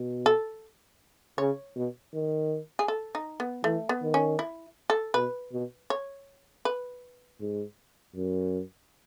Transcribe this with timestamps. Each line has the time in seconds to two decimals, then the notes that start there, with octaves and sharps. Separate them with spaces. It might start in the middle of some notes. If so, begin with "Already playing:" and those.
Already playing: B2
0.26 A4
1.38 C#3 C#5
1.76 B2
2.14 D#3
2.79 G#4
2.88 A4
3.15 D#4
3.40 B3
3.64 E3 A3
3.89 B3
4.02 D#3
4.14 C#4
4.39 E4
4.90 A4
5.14 B2 B4
5.52 B2
5.90 C#5
6.65 B4
7.41 G#2
8.16 F#2